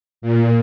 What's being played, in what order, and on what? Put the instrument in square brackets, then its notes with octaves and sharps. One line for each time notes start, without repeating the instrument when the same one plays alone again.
[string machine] A#2